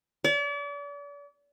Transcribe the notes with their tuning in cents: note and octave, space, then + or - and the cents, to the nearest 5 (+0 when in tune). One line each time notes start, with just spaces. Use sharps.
D5 -40